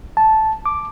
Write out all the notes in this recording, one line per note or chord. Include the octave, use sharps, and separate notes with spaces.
A5
D6